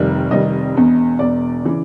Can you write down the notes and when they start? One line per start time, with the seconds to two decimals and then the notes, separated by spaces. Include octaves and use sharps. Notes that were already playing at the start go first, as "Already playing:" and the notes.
Already playing: F1 F2 C3 D#3 G3
0.31 F1 F2 C3 D#3 G3 D#5
0.75 E1 E2 B2
1.19 E1 E2 B2 D5
1.65 C#3 E3